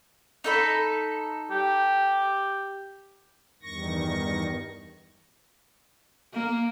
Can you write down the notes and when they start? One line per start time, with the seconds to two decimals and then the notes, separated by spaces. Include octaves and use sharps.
0.44 D#4 A4 B5
1.51 G4
3.62 E2 G2 D#3 C#6 A#6
6.34 A#3